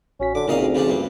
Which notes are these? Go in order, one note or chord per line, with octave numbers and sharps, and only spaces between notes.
A1 C#4 F#4 B6
D3 D6
A#2 C#3 C4 C#4 D#4 D#5 F5
D2
C#3 F3 D4
G2 A#3